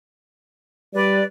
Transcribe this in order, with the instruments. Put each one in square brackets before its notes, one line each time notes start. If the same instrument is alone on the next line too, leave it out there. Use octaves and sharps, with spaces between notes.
[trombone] G3 [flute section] B4 D5